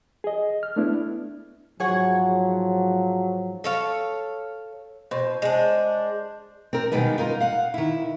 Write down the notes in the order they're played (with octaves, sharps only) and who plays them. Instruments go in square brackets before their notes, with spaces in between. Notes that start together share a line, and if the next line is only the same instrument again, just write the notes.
[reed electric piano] G#4 D#5
F6
A3 B3 D4 E4
[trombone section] G#2 F3 F#3 [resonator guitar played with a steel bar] G#4 C#5 F#5
[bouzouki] A4 C#5 F5
[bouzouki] B2 [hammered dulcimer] C5
[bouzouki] G#3 D4
[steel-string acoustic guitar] C4 A#4
B2 D#3 G3 G#3 B3 D#4
D#4 F4 A#4
F5 F#5
D#3 E4